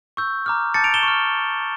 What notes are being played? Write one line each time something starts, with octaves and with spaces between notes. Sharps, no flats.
C#6 E6 G6
A#5 D6 F6
A5 D6 G6 A6 C#7
D7 F7
E7 G7
C#6 F6